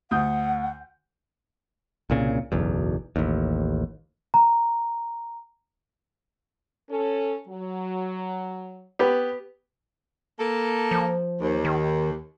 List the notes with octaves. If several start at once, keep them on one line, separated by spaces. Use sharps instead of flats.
D2 F#5 D#6 G6
C2 A#2 C#3
F#1 B1 E2
A1 D#2
A#5
C#4 A4
F#3
B3 G4 B4
A#3 A4
F3
D#2
D#3